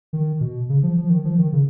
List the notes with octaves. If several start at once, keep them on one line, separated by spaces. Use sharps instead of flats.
D#3
B2
C#3
F3
F3
D#3
F3
D#3
C#3